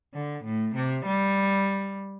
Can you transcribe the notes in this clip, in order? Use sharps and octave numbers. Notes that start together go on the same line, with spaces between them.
D3
A2
C3
G3